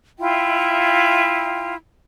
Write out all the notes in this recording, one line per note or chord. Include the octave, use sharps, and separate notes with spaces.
E4 F4 E5 G5